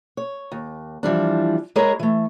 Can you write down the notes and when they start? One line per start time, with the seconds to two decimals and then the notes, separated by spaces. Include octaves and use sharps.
0.17 C#5
0.52 D#2
1.03 E3 F3 G3 D4
1.76 G#3 E4 G#4 A#4 C#5 D#5
1.99 E3 A3